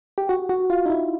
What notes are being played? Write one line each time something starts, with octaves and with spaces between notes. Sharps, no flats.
G4
F#4
F#4
F4
D#4
E4